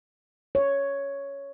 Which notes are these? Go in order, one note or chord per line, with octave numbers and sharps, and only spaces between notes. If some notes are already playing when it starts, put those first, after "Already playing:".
C#5